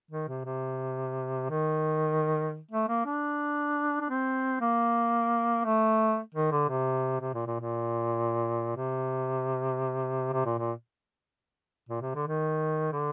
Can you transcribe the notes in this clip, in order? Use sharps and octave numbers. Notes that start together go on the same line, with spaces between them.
D#3
C3
C3
D#3
A3
A#3
D4
D4
C4
A#3
A3
D#3
D3
C3
C3
A#2
A#2
A#2
C3
C3
A#2
A#2
A#2
C3
D3
D#3
D3